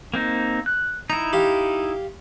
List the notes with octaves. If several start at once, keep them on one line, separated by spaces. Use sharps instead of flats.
A#3 C4 D#4
F#6
D#4 E4 A#5
G4 F5